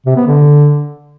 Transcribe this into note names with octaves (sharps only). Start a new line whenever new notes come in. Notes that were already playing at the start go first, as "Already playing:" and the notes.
C3
B3
D3